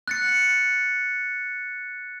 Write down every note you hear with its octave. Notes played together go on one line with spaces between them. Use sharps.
F#6 A6 C#7